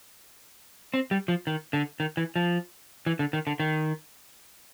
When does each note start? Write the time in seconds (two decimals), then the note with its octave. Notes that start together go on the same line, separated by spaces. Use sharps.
0.94 C4
1.11 G3
1.28 F3
1.47 D#3
1.73 D3
2.00 D#3
2.17 E3
2.36 F3
3.06 E3
3.19 D3
3.33 D#3
3.47 D3
3.60 D#3